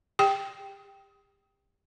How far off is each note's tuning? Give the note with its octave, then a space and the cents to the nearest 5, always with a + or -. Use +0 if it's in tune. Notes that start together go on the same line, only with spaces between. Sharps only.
G4 +35 G5 +0